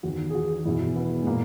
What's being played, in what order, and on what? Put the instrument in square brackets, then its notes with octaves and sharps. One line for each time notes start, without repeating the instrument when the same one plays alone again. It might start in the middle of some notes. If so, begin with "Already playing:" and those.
[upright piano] E2 D#3 F#4
G#4
F#4
E2 B2 E4
B3
G#3
A#2 A#3